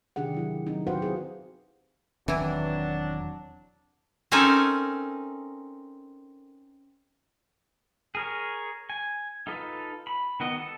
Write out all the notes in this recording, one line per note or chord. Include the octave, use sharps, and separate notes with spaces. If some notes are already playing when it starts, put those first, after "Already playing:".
C3 D#3 D4 G4 G#4 F#5
F#3 E4 G4
F#3 C4 D#4
F#4 G4 B4 C5 F5 F#5
C4 E4 F#4 G#4
E1 D#3 E3 F#3 C4 D4 E4
C4 C#4 D#4 A4 A#4 G#5
G#4 A#4 C#5
G#5
D#4 F4 A4 B4
B5
D#3 B3 F#4 D#5
A4